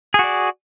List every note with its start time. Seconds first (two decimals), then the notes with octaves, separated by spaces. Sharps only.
0.14 G#4
0.19 F#4
0.24 D5